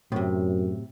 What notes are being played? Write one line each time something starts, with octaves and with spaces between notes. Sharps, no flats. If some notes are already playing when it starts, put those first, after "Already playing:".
F#2 A2 C3